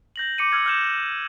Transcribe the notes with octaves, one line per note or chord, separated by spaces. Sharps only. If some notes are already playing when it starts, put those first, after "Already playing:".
G6 A#6 F#7
D6 C#7 D#7
E6 F6 G#6 F#7
F6 G6 E7